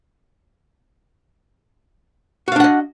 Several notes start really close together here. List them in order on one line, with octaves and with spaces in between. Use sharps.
F#4 F5 D4 F#5 D#5